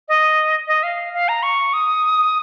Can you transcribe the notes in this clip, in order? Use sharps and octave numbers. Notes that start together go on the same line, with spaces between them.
D#5
D#5
F5
F5
A#5
C#6
D#6